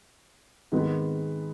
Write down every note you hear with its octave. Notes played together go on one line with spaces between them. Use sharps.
G#2 D#3 G#3 B3